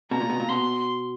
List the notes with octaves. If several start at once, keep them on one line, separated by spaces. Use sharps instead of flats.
B2 A#5
A#2
B2
A#2
B2 C6